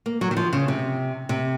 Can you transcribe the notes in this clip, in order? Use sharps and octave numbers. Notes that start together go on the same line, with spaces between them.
A#3
F#3
D#3
F3
C#3
C3
C3